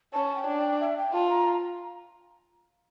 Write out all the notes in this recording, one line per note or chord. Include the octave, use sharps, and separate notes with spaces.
C#4 A5
G5
D4
G5
E5
G5
F4 A5
A#5